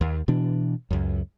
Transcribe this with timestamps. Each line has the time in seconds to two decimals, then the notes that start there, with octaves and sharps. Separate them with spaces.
0.01 D#2
0.28 B2 E3 D4
0.91 C#2 F#2